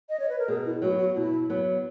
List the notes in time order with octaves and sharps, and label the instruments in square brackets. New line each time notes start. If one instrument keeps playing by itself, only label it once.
[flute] D#5
C#5
B4
A#4
[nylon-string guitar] B2 [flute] G#4
[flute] E4
[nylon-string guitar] F#3 B3 [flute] F#4
[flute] F#4
[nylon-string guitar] B2 [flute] E4
[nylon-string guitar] F#3 B3